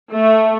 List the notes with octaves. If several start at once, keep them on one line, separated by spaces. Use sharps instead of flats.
A3